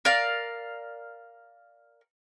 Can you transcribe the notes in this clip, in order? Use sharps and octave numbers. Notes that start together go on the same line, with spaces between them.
A#4 D5 F5